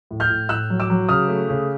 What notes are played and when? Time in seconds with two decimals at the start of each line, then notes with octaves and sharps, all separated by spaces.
0.11 A2
0.20 F6 G6
0.30 A2
0.49 A2 E6 F#6
0.70 F#3
0.80 D6 E6
0.90 F#3
1.09 C#3 D#6 F6
1.28 A3
1.49 C#3